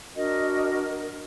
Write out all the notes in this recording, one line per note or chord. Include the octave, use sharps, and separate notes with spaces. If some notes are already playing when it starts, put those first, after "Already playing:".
D4 F#4 A#4 D#5